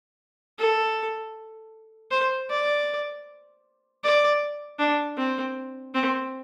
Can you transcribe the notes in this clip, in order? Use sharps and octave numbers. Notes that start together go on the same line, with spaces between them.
A4
C5
D5
D5
D4
C4
C4